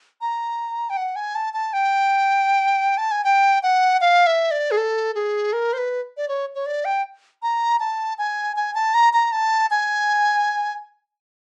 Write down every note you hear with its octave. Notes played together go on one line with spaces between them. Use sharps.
A#5
G5
F#5
G#5
A5
A5
G5
A5
G#5
G5
F#5
F5
E5
D5
G#4
A4
G#4
A#4
C5
B4
D5
C#5
C#5
D5
G5
A#5
A5
G#5
G#5
A5
A#5
A#5
A5
G#5